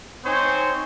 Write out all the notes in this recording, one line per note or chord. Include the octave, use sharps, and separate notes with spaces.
C4 D#4 C5 C#5 G#5